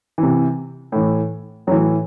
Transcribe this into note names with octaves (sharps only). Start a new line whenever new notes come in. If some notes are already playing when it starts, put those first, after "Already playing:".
C3 E3
A2 E3
A2 E3 F#3